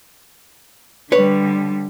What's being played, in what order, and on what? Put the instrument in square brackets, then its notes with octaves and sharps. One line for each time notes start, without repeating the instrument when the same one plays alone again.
[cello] D3 G3 [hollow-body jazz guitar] B4 C#5